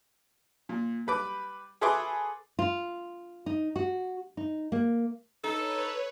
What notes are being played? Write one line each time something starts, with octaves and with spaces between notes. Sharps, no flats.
A#2
G3 B4 D6
G#4 A4 B4 E5 C6 D6
F4
D#4
F#4
D#4
A#3
D#4 A4 B4 C#5